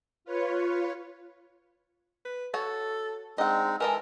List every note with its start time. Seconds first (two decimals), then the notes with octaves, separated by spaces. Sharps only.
0.25 F4 B4 C#5
2.25 B4
2.54 F#4 A4 C#5
3.38 G#3 C4 D4 D#4 D#5 F#5
3.80 E3 G#3 A4 A#4